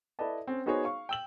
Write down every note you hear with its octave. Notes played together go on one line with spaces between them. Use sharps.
E4 A4 B4 D5 D#5 A5
C4 C#4
B3 D#4 F#4 G#4 C5 C#5
F5 C#6
G5 E6 F#7